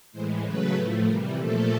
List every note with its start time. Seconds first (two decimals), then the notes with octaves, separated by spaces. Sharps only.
0.12 A2 E3 G#3 C5
0.43 C#3 F#3 A3 B4
0.73 A2 F3 A3
1.04 C3 E3 G3 A#4
1.34 A#2 F3 A3 A4